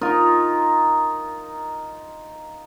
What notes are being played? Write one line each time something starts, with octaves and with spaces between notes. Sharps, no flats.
D#4 F4 A#4